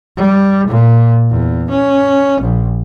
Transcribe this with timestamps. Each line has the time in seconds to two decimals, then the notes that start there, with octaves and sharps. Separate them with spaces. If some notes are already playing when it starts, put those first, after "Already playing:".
0.17 G3
0.68 A#2
1.30 E2
1.70 C#4
2.42 A#1